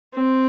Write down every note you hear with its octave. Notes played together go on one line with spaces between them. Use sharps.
C4